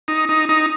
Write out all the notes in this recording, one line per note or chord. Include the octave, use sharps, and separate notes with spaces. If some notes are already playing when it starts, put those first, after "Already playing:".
D#4
D#4
D#4